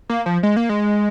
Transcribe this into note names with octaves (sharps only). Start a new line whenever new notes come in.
A#3
F3
G#3
A#3
G#3